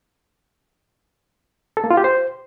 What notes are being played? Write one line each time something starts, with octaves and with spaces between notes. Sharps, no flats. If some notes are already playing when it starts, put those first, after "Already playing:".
A4
A#3
F4
G4
C5